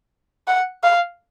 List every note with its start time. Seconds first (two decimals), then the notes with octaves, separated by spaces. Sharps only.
0.48 F#5
0.83 F5